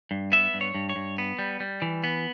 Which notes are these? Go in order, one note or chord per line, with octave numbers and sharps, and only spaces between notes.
G2
B3 E5
G2
C#5
G2
C#5
G2
B3
G3
G3
E3
B3